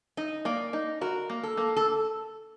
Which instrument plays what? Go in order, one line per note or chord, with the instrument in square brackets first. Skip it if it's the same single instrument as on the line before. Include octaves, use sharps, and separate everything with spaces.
[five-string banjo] D#4 [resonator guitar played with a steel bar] D#5
[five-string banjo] A#3 [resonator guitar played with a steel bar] D5
[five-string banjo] D#4
[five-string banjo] F#4 [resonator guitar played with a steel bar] A#4
[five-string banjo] A#3
[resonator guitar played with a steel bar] A4
[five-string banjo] A#3
[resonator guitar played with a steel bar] A4